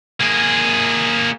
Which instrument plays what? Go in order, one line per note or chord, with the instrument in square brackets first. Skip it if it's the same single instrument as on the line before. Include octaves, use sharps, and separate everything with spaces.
[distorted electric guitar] A#3 G#4